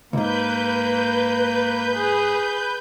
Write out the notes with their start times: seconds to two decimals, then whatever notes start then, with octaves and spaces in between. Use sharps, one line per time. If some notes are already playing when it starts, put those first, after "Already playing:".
0.13 C#2 G#2 A#3 B4 G6
1.94 G#4